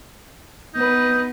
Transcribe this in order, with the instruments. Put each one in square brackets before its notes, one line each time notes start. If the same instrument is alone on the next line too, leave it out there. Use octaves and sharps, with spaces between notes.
[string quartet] B3 B4 [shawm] D#4